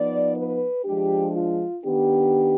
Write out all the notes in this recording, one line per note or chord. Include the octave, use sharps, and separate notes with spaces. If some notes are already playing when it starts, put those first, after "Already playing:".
Already playing: F3 B3 D#4 D5
B4
F3 G#3 D4 G4
F4
D#3 B3 D4 G4